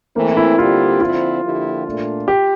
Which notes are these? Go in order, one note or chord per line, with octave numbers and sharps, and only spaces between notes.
E3 A3 A#3 C4
E4
D2 D3 G3 C4 F4 G4
D3 F3 C4 E4 F4
D3 F3 A#3 E4 G4
A#2 A3 D4
G4